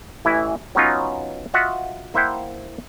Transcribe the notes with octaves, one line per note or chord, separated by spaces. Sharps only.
A1 E3 C#4 E4 G#5
F#3 B3 C#4 D#4 F4
F4 F#4 D#5 E5 F#5
A#3 E4 C5 E5 F#5 G5